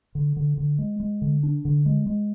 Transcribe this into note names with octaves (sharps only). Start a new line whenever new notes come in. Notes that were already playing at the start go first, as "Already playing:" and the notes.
D3
D3
D3
G#3
G#3
D3
D4
D3
G#3
G#3